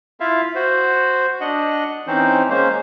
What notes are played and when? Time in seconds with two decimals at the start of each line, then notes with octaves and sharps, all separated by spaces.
0.20 E4 F4 E5 F5
0.55 F#4 C5
1.41 D4 D#5 F#5
2.07 E3 C4 C#4 D#4 C5
2.50 G#3 A#3 C#4 C5